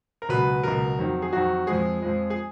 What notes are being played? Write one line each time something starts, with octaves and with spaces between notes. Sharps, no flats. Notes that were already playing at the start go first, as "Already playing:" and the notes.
A#4
C#2 B2 F#3 B4
C#2 B2 F#3 A#4
F2 D#3 F#3
G#4
F2 D#3 F#3 F#4
F2 F3 G#3 G#4
F2 F3 G#3
G#4